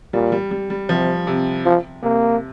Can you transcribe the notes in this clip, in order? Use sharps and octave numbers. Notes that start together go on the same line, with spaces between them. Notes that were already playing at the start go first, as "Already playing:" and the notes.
A#2 G3
G3
G3
G3
C3 F3
C3
F3
C3 A#3